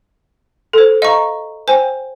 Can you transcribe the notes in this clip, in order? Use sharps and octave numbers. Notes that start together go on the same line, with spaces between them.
A4 C5
D#5 F5 A#5 C#6
C5 G5 G#5